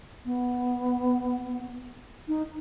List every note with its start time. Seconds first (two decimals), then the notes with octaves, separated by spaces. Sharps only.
0.26 B3
2.28 D#4